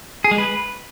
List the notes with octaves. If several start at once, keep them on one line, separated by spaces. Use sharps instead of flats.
G#4
G#3
B4